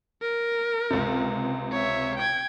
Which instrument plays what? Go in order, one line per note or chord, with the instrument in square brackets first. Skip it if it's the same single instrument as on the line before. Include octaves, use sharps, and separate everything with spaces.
[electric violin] A#4
[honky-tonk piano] C#2 C3
[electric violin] C#5 E5
G5 G#6